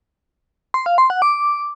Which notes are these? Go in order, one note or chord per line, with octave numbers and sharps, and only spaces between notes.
C6
F5
C6
F#5
D6